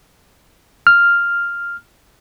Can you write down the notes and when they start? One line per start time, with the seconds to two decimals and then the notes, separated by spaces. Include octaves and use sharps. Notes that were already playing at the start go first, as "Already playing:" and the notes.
0.87 F6